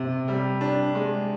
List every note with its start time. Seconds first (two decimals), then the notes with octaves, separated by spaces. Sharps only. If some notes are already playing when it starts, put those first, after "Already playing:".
Already playing: C3
0.28 G3
0.61 D4
0.95 G#3